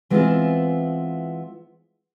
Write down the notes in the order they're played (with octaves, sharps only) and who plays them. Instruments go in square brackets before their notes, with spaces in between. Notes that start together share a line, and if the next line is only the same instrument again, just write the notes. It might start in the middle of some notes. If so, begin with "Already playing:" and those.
[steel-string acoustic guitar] E3 G#3 B3 C4 E4 F4